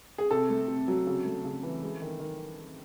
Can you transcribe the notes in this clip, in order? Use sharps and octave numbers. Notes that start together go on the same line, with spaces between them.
G#4
C3 A4
A3
C3
F#3
C#3
A3
C#3
E3
G#3
D#3
D#3